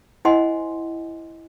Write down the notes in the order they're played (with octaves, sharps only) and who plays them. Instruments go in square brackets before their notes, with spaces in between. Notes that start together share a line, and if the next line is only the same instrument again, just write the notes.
[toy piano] E4 C5 D#5 F#5 G#5 C6